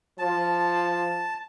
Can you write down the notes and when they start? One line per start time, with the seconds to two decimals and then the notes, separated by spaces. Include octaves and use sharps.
0.19 F3 A5